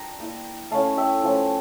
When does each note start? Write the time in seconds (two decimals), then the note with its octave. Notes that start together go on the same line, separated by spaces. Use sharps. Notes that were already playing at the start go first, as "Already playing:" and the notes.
Already playing: D4 F4 G5 A#5
0.20 A#3 E4
0.71 A3 C#4 E4 F5 A5
0.97 E5 G5
1.23 F3 A3 C#4